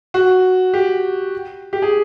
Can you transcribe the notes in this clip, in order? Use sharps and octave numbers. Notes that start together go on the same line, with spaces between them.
F#4
G4
G4
G#4